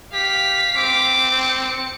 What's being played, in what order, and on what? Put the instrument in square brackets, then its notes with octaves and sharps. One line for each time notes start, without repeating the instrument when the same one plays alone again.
[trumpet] G4 [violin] F5 B6
[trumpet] C4 [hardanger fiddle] D6
[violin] C#7